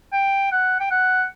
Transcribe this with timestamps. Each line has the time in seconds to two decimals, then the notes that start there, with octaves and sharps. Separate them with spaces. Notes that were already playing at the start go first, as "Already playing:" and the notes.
0.13 G5
0.52 F#5
0.80 G5
0.91 F#5